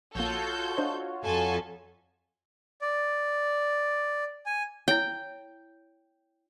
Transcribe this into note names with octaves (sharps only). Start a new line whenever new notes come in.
A#1 A#3 F4 F#4 A4 C#5 G6
D4 C5 D#5
F2 A4 G#5 A5
D5
G#5
E4 C#5 G5